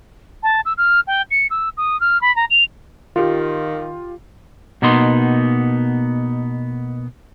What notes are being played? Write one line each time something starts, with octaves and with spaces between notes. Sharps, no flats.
A5
E6
F6
G5
C#7
E6
D#6
F6
B5
A#5
F7
D#3 F4 G4
B2 A#3 B3 D#4 C6